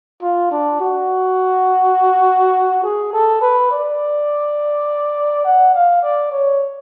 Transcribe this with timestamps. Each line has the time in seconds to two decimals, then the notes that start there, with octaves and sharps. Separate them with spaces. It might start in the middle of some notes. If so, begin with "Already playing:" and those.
0.22 F4
0.51 D4
0.80 F#4
2.84 G#4
3.13 A4
3.42 B4
3.71 D5
5.45 F#5
5.74 F5
6.02 D5
6.31 C#5